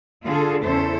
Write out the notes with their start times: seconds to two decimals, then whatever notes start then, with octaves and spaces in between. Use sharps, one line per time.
0.25 D3 F4 G#4 A4
0.63 E2 C#3 C#4 E4 A4 C5